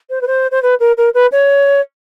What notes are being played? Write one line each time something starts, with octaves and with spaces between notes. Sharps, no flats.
C5
B4
C5
C5
B4
A#4
A#4
B4
C#5